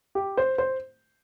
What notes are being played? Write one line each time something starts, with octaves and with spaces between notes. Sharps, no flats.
G4
C5
C5